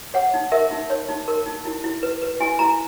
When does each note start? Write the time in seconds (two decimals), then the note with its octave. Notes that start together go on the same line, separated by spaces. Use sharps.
0.14 C#5 F#5
0.34 D#4
0.52 A#4 E5
0.71 D#4
0.90 C#5
1.09 D#4
1.28 A#4
1.46 D#4
1.65 E4
1.84 E4
2.03 B4
2.22 B4
2.40 E4 G#5
2.59 E4 A#5